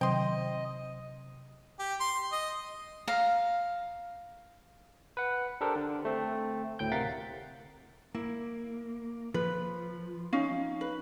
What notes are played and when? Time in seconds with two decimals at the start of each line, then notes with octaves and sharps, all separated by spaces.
0.01 C3 D#3 F#3 D#5 G5 C6
1.79 G4
2.00 C6
2.32 D#5
3.08 F5 A#5
5.17 B4 F#5
5.61 D4 G4 A4 A#4 C5
5.76 D3
6.05 A3 C4
6.79 D2 A2 G5 G6
6.92 C3 A#4 F5 F#5 A6 B6
8.15 A#3 E4
9.34 F3 B4
10.33 C#4 D#4 F5
10.81 B4